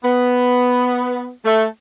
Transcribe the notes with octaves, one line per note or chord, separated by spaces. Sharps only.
B3
A3